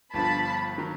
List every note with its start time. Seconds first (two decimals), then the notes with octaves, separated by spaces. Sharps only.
0.14 G1 G2 D3 F3 A5 B5
0.78 D#3 F#3